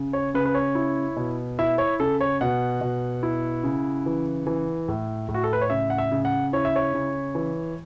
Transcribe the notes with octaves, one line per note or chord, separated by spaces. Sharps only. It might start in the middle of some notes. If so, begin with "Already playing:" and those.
Already playing: C#3
C#5
C#3 B4
B4
C#5
E4
B2
E4 E5
C#5
C#3 A4
C#5
B2 F#5
B2
E4
C#3
E3
E3
A2
A2
F#4
A4
B4
C#5
C#3 E5
F#5
E5
C#3
F#5
E4 C#5
E5
C#5
C#3
E3